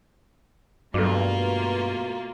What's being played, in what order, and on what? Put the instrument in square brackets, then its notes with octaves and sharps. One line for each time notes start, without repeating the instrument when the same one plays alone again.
[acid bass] G2 [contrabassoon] B2 [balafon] F#3 A4 [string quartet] A3 A#3 F4